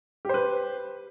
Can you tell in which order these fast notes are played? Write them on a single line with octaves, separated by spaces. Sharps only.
G4 C5 B4